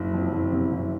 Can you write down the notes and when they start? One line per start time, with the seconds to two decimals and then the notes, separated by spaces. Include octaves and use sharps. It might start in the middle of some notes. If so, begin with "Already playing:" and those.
Already playing: F#1
0.14 F2
0.33 F#1
0.52 C3
0.72 F#1